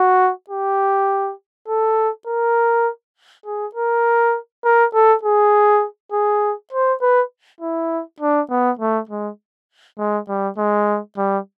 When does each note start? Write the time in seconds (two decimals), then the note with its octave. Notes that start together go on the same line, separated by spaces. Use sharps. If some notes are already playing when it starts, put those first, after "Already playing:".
Already playing: F#4
0.49 G4
1.68 A4
2.27 A#4
3.46 G#4
3.75 A#4
4.64 A#4
4.94 A4
5.23 G#4
6.12 G#4
6.73 C5
7.01 B4
7.61 E4
8.20 D4
8.50 B3
8.79 A3
9.09 G#3
9.98 G#3
10.28 G3
10.58 G#3
11.18 G3